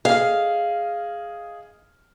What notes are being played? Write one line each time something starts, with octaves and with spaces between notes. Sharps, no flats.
G#4 D#5 F5 F6